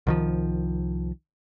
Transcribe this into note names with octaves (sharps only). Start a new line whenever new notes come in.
C2 D#3 F3